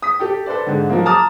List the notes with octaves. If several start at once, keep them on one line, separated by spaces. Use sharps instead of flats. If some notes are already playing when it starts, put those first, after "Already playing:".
D#6 B6
G4 A4 G5
A4 B4 C5 D5
G#2 D3
F3 F#3 A#3
A5 A#5 D6 D#6 F6 A6